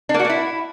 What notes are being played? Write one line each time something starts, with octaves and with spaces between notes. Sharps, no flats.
D4
A#3
F#4
A#3
E4